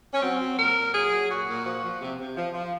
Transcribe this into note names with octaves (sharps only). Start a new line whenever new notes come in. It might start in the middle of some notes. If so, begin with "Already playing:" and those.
C#4
F#3 C4
F#3
A#2 A#4
A#2
F#3 G#4
F#3
A#2 F#4
A#2
F3 F#4
F3
C3
C3
F3
F3